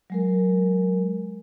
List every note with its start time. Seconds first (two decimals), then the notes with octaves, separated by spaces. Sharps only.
0.10 F#3 G#3 A#4